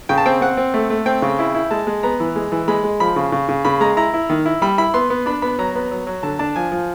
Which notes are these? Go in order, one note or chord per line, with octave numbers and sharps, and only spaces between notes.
C#3 G5
A5
C4 G5
C4 F#5
C4
A3
A3
C4 G5
C#3
E4
E4
G#3 A5
G#3
B3 A#5
E3
G#3
E3
G#3 B5
G#3
F3 B5
C#3
C#3
C#3
C#3 B5
G#3 A#5
E4 A#5
E4
D#3
E4
G3 B5
E4 B5
B3 C6
B3
D4 B5
B3 B5
F#3 A#5
B3
F#3
F#3
D3 A5
D4 A5
F3 G#5
F3